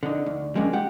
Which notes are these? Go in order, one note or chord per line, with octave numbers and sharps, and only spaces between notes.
D3 D#4
D2
G3 G#3 A#3 C#4 D4
G4 F#5